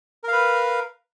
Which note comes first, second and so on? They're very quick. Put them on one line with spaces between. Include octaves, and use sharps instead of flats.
A#4 F5 B4